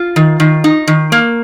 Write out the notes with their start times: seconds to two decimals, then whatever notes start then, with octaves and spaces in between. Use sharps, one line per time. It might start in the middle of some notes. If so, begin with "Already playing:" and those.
Already playing: F4
0.16 D#3
0.40 D#3
0.64 D#4
0.87 D#3
1.12 A#3